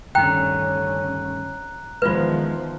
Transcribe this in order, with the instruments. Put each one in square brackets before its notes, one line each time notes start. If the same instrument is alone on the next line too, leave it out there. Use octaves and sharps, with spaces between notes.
[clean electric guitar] D2 G2 D#3 [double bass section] D3 C#4 [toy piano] G5 [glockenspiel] A#5 F#6
[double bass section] E2 D#3 F3 [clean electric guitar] G#3 [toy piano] F4 B4